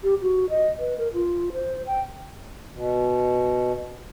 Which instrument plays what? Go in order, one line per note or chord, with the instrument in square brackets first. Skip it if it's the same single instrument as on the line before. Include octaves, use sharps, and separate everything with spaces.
[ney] G4
F#4
D#5
B4
A#4
F4
C5
G5
[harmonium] B2